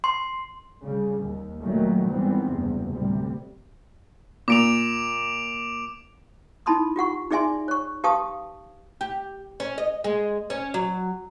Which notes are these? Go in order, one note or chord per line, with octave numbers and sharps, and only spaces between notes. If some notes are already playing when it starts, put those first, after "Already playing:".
C6
C#3 G3
D#2
A#2 D#3 F#3 G3 A3
G#1 D#3 E3 G3 B3 C4
F#1 E2 G2 C3
D2 A2 C3 G3
A#2 D6 D7 F7
D#4 E4 A5 B5 C6 D#6
F4 G4 F#5 C#6
D#4 G#4 D5 E5 G#5 C6
C#5 C#6
G4 B4 F5 A5 C#6 D#6
G4
C#4
D#5
G#3
C#4
F#3